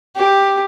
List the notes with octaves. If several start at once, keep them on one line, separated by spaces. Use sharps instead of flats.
G4